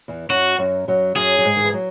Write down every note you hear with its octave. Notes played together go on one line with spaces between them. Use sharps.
E2 E3
F#2 F#3 F#4
F#2 F#3
F#2 F#3
F#2 F#3 G#4
F#3
G#2 G#3
D#3
E3
F#3